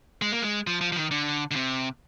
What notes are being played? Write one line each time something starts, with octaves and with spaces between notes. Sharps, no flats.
G#3
A#3
G#3
F3
F3
F3
D#3
D3
D3
C3